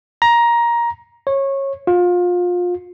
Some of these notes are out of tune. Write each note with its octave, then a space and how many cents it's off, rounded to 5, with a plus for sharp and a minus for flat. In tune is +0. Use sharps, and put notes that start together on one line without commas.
A#5 +15
C#5 -20
F4 +25